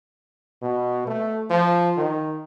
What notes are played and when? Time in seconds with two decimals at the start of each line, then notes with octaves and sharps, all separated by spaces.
0.62 B2
1.07 A3
1.50 F3
1.97 D#3